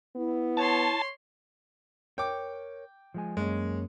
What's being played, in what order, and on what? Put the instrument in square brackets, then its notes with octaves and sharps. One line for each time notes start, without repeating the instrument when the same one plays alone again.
[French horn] B3 [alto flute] E4
[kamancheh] C#5 C6 [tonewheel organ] A5
[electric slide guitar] A#4 C#5 [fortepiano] G5 D6
[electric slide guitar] F3 G#3 G#5
[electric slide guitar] F#2 A#3 C#4 [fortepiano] G#3